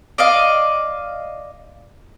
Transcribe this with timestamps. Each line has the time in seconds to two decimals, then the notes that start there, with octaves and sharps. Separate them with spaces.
0.18 D5 D#5 F5